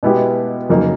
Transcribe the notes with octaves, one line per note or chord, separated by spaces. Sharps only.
B2 G#3 B3 E4 G4
F2 C#3 F#3 A#3 D#4